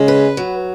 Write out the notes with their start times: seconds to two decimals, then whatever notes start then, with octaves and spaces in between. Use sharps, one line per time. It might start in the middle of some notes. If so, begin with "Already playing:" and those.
Already playing: C#3 G#3
0.08 B4
0.37 F#3